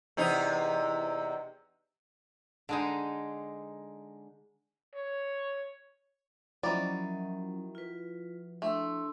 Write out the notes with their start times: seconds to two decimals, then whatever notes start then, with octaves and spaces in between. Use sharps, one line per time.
0.17 E2 C3 D#4
2.69 D3 G#3 D#4
4.94 C#5
6.63 D#3 F3 F#3 C#4 D#4 E4 F#4 D5
7.75 F4 B4
8.62 A3 D4 C6 E6